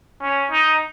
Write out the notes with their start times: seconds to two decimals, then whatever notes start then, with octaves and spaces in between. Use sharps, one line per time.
0.21 C#4
0.51 D#4